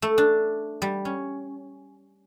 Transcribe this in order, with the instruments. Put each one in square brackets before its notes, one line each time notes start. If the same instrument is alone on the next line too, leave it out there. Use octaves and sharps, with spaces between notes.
[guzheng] A3
D4
G3
C#4